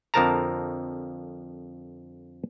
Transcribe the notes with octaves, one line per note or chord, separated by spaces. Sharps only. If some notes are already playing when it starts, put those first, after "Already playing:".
F2 D3 F3 A#4 A5 A#5